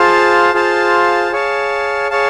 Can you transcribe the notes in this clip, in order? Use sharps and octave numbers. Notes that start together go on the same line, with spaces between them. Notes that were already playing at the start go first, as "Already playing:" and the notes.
Already playing: F4 G#4 C5 F5 A5
F4 G#4 C5 F5 A5
G#4 C#5 F5 A5
G#4 C#5 F5 A5